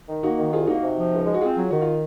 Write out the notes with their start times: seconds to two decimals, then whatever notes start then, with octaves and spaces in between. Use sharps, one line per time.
0.09 D#3
0.23 A#3 D#4 F#4
0.38 D#3
0.53 C2 F4 G#4
0.67 A#3 D#4 F#4
0.82 C3
0.97 F3
1.12 C#2
1.26 G#3
1.34 F#4
1.41 C4 F4 G#4
1.57 F#3
1.71 D#3 F#4
1.82 F4